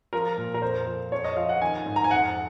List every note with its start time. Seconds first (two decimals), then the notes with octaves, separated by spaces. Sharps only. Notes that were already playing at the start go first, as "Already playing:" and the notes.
0.13 F3 A#4
0.38 A#2
0.54 A#4
0.62 F2 C5
0.87 F3
1.11 F2 C#5
1.24 D#5
1.36 F3 F5
1.49 F#5
1.62 D#3 G#5
1.86 G#2
1.96 A#5
2.04 G#5
2.11 F2 F#5